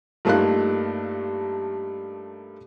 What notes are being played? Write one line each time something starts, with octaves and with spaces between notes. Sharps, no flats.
G2 A3 A#3 D#4 F4 F#6